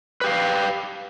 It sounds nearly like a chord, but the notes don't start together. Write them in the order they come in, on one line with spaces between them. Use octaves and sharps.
B4 G4 F5